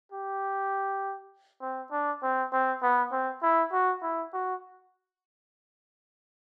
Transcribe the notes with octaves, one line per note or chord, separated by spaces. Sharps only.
G4
C4
D4
C4
C4
B3
C4
E4
F#4
E4
F#4